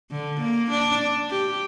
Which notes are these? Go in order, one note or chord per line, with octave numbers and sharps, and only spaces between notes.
D3
A#3
D4
G4